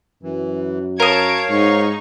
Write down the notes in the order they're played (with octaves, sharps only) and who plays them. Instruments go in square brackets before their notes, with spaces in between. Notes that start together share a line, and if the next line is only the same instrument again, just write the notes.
[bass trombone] F#2 [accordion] E3
[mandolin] A#4 D#6 [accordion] C#5 F5 [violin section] A5 G#6 D7
[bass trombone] G#2 [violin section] D#4 C#6